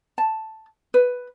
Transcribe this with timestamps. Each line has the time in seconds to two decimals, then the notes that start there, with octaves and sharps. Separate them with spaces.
0.18 A5
0.94 B4